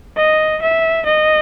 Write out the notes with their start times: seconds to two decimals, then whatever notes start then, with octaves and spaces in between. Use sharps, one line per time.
0.17 D#5
0.62 E5
1.06 D#5